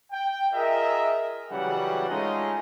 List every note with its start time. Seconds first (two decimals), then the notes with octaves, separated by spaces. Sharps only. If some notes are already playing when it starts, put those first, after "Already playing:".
0.12 G5
0.54 F4 G#4 A#4 D#5 E5
1.51 C#3 E3 F#3 G3 G4 F#5
2.09 G#3 A3 C#4 D#4 F4 D#5